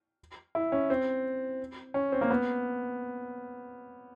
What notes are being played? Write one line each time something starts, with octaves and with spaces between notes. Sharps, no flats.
E4
C#4
C4
C#4
C4
A#3
B3